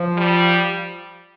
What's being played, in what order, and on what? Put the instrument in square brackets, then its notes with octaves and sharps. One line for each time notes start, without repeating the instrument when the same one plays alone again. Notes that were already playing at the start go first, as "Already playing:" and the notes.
Already playing: [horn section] F3
[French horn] G3